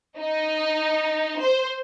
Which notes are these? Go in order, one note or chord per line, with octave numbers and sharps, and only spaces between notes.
D#4
C5